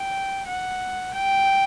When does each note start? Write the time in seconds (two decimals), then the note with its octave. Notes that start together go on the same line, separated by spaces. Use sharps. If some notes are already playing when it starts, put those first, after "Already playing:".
Already playing: G5
0.47 F#5
1.14 G5